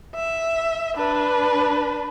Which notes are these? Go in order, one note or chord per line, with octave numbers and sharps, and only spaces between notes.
E5
D4 B4